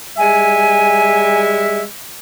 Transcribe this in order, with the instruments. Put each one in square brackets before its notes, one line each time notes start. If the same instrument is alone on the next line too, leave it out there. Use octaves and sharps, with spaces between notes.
[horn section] G3 G#3 E5 [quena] G#5